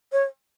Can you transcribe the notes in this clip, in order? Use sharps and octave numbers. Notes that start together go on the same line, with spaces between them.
C#5